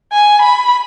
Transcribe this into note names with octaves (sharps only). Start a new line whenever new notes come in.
G#5
B5